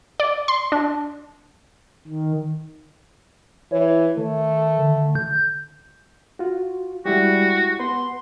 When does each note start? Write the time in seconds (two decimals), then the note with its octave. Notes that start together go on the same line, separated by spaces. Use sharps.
0.20 D5
0.48 C6
0.72 D4
2.08 D#3
3.72 E3 C#5
4.17 D#3 A3
4.79 D3
5.15 G6
6.39 F4 F#4
7.06 G3 G#3 E4 F#4 G4
7.80 B3 B4 F#5 C6